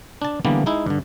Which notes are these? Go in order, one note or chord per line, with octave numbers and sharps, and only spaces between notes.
D4 A5
D3 E3 G3 A#3 B3
G#3 D#4 E4
G2 D3